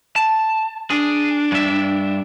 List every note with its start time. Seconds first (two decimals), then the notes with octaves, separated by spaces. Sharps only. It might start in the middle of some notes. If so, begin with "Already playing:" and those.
0.16 A5
0.90 D4 G#4
1.52 G2 E5